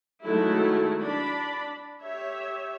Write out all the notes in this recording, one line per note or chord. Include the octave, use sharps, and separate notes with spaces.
D#3 F#3 G#3 A3 E4
D4 D5 B5
G4 C#5 E5